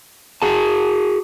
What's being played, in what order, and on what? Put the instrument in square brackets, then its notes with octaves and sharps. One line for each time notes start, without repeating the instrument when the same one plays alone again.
[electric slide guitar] F#4 G#4 A5